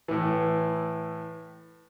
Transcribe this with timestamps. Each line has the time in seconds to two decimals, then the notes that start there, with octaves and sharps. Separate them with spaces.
0.08 A2 E3